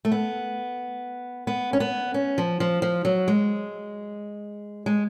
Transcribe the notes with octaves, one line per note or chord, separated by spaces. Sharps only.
A3
B3
B3
C#4
B3
C#4
F3
F3
F3
F#3
G#3
G#3